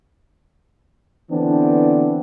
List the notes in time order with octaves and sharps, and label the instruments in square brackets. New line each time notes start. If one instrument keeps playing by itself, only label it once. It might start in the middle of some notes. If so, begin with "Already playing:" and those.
[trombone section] D3 E3 B3 C4 D4